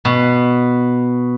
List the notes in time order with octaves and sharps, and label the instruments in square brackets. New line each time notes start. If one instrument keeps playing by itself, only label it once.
[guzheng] B2